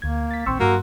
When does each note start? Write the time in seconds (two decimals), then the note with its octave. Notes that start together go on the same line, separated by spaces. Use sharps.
0.02 D2 A#3 G#6
0.31 A6 B6
0.46 A#1 D#2 C4 C6 C#6 E6
0.60 G2 F#3 A#3 F#4